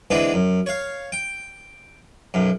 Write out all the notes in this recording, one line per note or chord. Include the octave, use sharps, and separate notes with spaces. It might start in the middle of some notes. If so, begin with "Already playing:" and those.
D3 E3 G#3 B3 C4 D4
F#2
C#5 F5
G5
B1 F#2